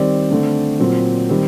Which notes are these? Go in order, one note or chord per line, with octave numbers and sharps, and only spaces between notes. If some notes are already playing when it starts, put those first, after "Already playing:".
Already playing: D#3 G3 C4 D5
D3 A3 C4
A#2 F#3 C4
D#3 G3 C4